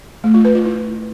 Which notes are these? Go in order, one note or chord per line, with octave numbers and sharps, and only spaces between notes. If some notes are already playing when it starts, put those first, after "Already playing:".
A3
F4
B4
F4
E4